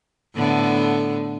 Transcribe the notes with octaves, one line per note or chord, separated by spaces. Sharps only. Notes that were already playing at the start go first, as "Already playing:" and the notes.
A2 D3 B3